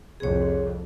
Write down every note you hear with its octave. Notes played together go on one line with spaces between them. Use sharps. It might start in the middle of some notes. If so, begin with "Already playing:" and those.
C2 F2 G#4 C#5